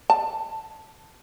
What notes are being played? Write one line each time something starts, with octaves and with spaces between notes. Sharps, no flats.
A5